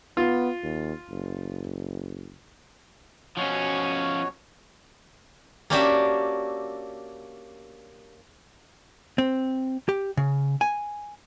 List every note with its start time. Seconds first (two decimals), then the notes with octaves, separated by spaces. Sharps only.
0.17 B3 F4
0.63 D#2
1.09 F#1
3.37 B2 F3 C#4 F#4 C#5
5.70 A#3 C#4 D4 F#4 G4 E5
9.18 C4
9.89 G4
10.17 C#3
10.61 G#5